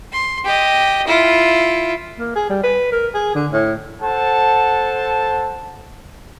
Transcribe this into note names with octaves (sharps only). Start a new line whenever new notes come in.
C6
G4 D#5
E4 F4
A#3
G#4
G3
B4
A#4
G#4
D3
A2
A4 C5 F#5 A5